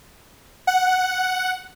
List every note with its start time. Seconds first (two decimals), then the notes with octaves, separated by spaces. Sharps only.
0.67 F#5